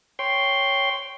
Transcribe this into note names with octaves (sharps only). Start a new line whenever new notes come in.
C#5 G5 C6